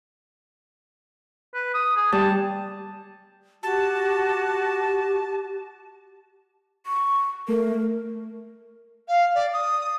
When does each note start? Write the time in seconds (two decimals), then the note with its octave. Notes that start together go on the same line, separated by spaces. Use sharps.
1.54 B4
1.74 D#6
1.96 G#4
2.12 G3 A5
3.63 F#4 G4 A5
6.86 C#6
7.48 A3 A#4
9.08 F5
9.35 D5
9.53 D#6